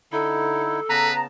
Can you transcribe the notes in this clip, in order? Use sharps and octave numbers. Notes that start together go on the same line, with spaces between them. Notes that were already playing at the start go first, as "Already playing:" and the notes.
D3 D#4 E4 A4
C#3 B3 B4 A5 A#5